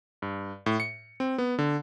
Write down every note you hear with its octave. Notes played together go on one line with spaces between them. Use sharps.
G2
A2
C#7
C4
B3
D3